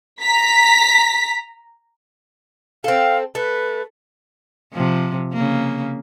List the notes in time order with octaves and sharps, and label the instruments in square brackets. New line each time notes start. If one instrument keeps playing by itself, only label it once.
[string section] A#5 B6
[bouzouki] C4 A4 [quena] F5
[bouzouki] A3 [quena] B4
[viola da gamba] C3 F3
C#3 A#3